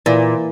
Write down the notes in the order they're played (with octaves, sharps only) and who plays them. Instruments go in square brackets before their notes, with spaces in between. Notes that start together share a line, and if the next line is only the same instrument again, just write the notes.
[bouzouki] A#2 [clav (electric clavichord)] E3 A#3